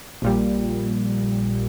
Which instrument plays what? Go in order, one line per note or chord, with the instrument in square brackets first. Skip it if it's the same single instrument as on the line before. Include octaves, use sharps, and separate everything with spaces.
[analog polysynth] A#1 A#2 G3